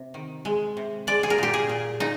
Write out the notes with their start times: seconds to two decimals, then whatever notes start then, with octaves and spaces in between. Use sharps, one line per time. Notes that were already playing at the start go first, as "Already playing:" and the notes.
Already playing: C3
0.14 D#3
0.45 G#3
0.77 C3
1.07 G#3 D5
1.23 G#4
1.30 A#4
1.38 A#2 G4
1.54 G#4
1.69 A#2
2.00 A#2 D#4